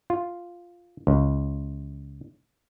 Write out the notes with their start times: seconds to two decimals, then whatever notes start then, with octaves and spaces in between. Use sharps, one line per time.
0.10 F4
1.07 C#2